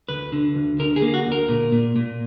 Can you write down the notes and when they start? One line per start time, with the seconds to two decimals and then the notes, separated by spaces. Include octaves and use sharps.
0.08 D2 B4
0.32 D3
0.55 D2
0.79 D3 A#4
0.96 G#4
1.02 A#3
1.14 F#4
1.26 D2
1.32 A#4
1.48 A#2
1.72 A#2
1.96 A#2